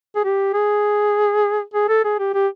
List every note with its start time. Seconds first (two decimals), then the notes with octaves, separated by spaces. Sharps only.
0.16 G#4
0.24 G4
0.53 G#4
1.74 G#4
1.89 A4
2.05 G#4
2.19 G4
2.34 G4